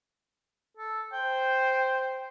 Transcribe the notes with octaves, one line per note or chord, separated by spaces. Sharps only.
A4
C5 G5